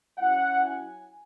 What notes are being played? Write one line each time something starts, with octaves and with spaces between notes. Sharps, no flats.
F#3 C#4 E4 F#5
G#5